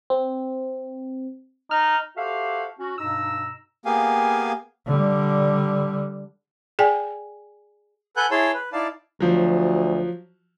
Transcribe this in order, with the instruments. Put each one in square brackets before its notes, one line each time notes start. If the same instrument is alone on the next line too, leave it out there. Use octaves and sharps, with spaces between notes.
[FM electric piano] C4
[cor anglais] D#4 [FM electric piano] F6
[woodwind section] F#4 G4 A4 C5 E5 F5
C#4 F#4
G2 B2 D#4 A#5 E6
[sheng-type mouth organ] A#3 B3 G4 G#4 F5 G#5
[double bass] D3 G3
[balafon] G#4 D5 G5 G#5
[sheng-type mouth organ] A4 B4 F#5 G#5 F#6 G6
E4 G#4 C#5 A5 C6 E6
B4
D#4 E4 D5 F5 A5
[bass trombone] D2 [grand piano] F3 F#3